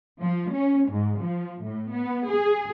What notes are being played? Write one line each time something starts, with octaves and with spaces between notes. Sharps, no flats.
F3
C#4
G#2
F3
A2
B3
G#4